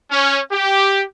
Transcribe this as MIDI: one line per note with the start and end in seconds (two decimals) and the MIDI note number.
0.10 0.39 61
0.51 1.02 67